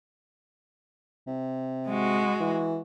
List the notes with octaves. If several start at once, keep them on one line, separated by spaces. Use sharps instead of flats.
C3
G#3 F#4
E3